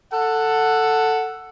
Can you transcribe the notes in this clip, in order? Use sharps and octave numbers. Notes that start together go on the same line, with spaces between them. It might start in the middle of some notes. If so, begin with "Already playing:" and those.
A4 F#5